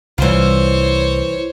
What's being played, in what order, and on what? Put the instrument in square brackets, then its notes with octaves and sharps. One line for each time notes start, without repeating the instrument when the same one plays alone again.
[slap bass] C2 G3 [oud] E3 F4 [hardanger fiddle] C5 C#5